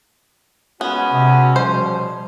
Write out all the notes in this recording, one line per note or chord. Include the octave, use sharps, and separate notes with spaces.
G#3 B3 C#4 F#4
C3
B2 F3 G3 C5